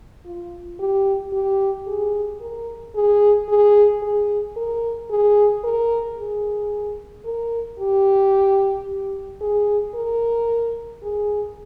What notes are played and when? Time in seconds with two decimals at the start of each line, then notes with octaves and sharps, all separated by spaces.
0.25 F4
0.79 G4
1.33 G4
1.87 G#4
2.40 A#4
2.95 G#4
3.48 G#4
4.02 G#4
4.56 A#4
5.10 G#4
5.63 A#4
6.18 G#4
7.25 A#4
7.79 G4
9.41 G#4
9.95 A#4
11.03 G#4